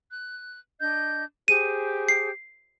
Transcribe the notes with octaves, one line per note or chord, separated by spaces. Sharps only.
F#6
D4 D#5 G6
G4 G#4 C5 D#7
C7